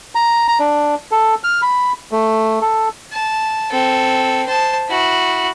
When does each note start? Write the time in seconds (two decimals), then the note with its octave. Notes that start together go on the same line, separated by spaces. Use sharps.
0.15 A#5
0.48 A#5
0.59 D4
1.11 A4
1.44 F6
1.62 B5
2.11 A3
2.62 A4
3.13 A5
3.72 C4 A4
4.47 C5 A5
4.89 E4 F#4